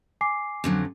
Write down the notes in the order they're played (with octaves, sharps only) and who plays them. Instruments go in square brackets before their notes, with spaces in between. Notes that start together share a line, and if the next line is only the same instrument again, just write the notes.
[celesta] G#5 D6 C7
[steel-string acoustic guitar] F2 D3 F#3